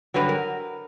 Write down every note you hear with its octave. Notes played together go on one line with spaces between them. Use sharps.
G2 D3 F#3 B4
A#4